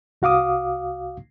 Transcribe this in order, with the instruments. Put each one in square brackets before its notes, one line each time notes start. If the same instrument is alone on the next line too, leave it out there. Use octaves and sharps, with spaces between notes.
[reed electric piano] C2 F#4 F5 D6 D#6